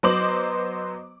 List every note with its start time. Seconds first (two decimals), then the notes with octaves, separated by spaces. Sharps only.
0.03 F#3 B3 C5 D#5 D6 F#7